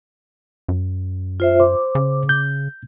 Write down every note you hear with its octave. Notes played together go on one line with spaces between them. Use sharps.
F#2
F4 C5 E5
C5 D6
C#3
G6